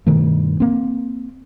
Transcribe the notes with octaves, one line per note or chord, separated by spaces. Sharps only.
G2 B2 D#3 A3
A#3 C4